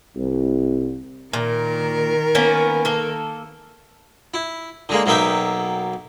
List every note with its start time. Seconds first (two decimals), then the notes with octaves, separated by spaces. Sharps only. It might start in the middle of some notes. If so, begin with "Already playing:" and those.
0.16 C2
1.33 A#2 D#3 A#4
2.35 A#3 B3 C#4
2.85 A#3 A4
4.34 E4
4.89 D3 G#3 A#3
5.06 B1 F#3 A#3 B3 E5 G5